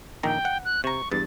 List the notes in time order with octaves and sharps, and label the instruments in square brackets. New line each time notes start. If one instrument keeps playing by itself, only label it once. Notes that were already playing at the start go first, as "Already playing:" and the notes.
[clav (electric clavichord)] A#1 D#3 A#5 [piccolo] G5
[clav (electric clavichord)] F#5
[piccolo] F#6
[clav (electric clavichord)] C3 A#5 [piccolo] C#6
[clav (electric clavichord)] E2 G2 [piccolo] A6